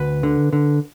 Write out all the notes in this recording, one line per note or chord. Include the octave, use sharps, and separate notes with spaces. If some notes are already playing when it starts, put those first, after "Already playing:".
Already playing: D2 B4
D3
D3